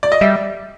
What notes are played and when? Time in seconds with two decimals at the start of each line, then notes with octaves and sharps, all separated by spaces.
0.03 D5
0.12 D#5
0.21 G3 E5